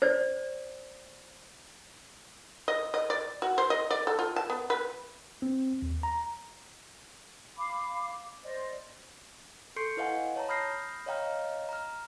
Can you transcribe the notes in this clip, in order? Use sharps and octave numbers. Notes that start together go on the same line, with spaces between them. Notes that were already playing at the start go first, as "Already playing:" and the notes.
C5 D5
D#5
D#5
D5
F#4
C5
D#5
D5
A4
F4
A5
B3
B4
C4
D#2
A#5
F5 B5 D6
C5 D5 D#5
A4 C6 C#6 G6 C7 C#7
E4 B4 D#5 F5 F#5 G#5
C#5 A5 A#5
B5 D#6 F6 G6 A#6 C7
C#5 D#5 F5 G5 A#5 F6
A#5 F6